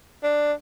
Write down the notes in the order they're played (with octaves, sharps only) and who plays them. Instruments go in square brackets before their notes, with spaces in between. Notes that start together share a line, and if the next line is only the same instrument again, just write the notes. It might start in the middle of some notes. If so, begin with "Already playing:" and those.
[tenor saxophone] D4